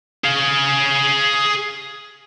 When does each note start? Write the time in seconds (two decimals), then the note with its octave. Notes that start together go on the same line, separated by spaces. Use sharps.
0.24 G#4 F5